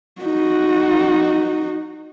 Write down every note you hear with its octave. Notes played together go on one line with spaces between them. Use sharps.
D#4 F#4